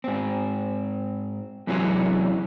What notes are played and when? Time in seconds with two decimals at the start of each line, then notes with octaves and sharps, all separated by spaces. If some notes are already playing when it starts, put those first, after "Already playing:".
0.04 G#2 C4
1.67 F#2 C3 E3 F#3 G#3 C#4